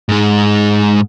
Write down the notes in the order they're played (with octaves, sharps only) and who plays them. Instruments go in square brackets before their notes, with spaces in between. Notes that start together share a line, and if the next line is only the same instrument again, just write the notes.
[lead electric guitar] G#2 G#3